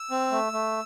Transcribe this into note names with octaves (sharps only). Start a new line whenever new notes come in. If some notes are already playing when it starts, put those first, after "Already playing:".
Already playing: E6
C4
A3
A3